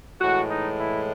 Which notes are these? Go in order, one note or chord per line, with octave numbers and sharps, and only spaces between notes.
A2 E3 G#3 F#4
D#4
E4